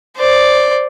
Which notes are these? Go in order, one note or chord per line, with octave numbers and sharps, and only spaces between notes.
C5 D5